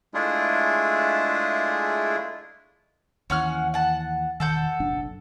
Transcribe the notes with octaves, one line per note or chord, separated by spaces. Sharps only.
G#3 A3 D4 E4 F4 G#4
D#2 E3 C#4 F#5 F6
F#5 A5
E1 D#3 A4 F#5 G6
F#1 B1 D4